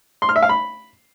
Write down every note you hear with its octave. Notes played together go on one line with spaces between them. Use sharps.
C6
F6
E5
F5
B5